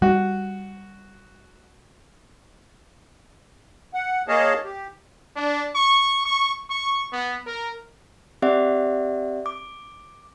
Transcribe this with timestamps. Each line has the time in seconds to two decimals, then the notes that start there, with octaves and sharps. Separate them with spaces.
0.02 G3 F#4
3.94 F#5
4.28 A#3 G#4 C#5 D#5 F5 A5
4.65 G4
5.36 D4
5.76 C#6
6.25 C#6
6.71 C#6
7.13 B3
7.47 A#4
8.42 C4 G4 D5 E5 F#5
9.46 D6